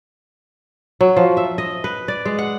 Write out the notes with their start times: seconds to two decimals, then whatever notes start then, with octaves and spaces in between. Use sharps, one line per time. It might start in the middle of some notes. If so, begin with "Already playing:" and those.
1.01 F#3
1.17 F3
1.37 E5
1.58 D#5
1.84 B4
2.08 D5
2.25 G#3
2.39 F#5